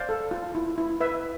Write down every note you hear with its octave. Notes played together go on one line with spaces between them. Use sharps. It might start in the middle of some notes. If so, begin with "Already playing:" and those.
Already playing: C5 D5 F5
A4
F4
E4
E4
B4 E5